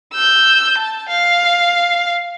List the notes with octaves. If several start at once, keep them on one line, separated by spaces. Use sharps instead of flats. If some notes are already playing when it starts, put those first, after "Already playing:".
E6 G6
A5
F5